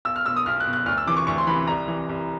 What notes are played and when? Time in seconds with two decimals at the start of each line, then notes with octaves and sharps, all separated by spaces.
0.05 B1 E6
0.16 F6
0.26 B2 E6
0.36 D#6
0.46 B1 F6
0.60 F#6
0.66 B2
0.73 F#6
0.86 D2 F6
0.97 E6
1.07 C3 E3 D6
1.17 C#6
1.27 D2 C#6
1.38 C6
1.47 C3 E3 B5
1.67 C2 A#5
1.88 C3 E3
2.09 C2